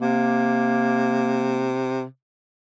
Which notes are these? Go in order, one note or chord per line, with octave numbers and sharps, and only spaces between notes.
C3 A#3